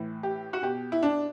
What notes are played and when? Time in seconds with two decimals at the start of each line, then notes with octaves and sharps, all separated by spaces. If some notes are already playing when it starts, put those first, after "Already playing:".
Already playing: A2 E3
0.23 G4
0.53 F#4
0.62 B2 G4
0.92 E4
1.03 D4